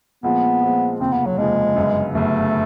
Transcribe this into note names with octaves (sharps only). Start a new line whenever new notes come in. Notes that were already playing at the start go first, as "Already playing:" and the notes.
A#2 F3 G#3 B3 C4
A#2 F3 G#3 C4
F1 D#2 C#3 F3 C4
B3
F#3
F1 D#2 C#3 F3 G#3
G1 F#2 C#3
G1 F#2 C#3 A3